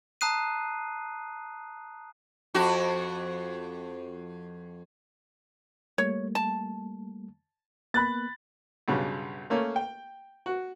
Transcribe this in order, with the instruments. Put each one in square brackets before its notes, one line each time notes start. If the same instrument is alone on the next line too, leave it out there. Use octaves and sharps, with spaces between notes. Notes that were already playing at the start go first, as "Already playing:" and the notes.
[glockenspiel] A5 A#5 D#6 F#6 C7 D#7
[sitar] F2 F#4
[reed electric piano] G3 A3 A#3 [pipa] C#5
[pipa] A5
[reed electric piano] A#3 B3 [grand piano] B5 F#6 A6
[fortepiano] B1 G2 C#3
A3 A#3 C#4
G5
F#4